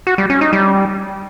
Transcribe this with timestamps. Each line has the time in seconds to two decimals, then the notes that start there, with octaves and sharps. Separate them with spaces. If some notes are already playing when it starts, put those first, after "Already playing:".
0.07 F#4
0.18 G3
0.30 C#4
0.41 D#4
0.53 G3